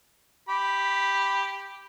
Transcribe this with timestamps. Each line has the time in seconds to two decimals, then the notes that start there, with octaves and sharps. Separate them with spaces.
0.49 G4 B5